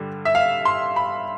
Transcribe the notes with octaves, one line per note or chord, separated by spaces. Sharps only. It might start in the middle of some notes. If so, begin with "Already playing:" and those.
Already playing: G2 D3 G3
E5
F5
C6
B5